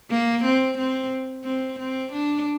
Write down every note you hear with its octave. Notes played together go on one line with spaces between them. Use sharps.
A#3
C4
C4
C4
C4
D4